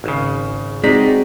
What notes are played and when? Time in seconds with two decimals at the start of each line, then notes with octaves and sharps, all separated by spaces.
0.04 G#1 C#3
0.84 G#3 C4 D#4 F#4 D5 B6